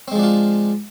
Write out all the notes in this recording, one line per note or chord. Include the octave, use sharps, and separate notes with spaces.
F3 G#3 C4 D4 F4